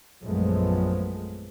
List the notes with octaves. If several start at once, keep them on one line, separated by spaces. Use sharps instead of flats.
A#1 F#2 F3 G#3 A3 B3